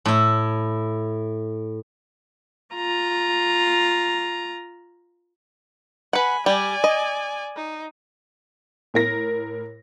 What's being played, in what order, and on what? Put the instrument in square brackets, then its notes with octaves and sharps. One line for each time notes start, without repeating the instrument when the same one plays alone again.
[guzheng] A2 E4
[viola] F4 A#5
[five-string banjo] B4 F#5 [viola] G#5 B5
[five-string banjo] G3 [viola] D5 G#5
[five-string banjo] D#5
[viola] D#4
[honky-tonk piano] A2 A#4 A#6